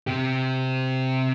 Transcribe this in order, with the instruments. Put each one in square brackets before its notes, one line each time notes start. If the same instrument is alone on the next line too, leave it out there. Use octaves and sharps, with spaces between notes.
[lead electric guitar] C3 G4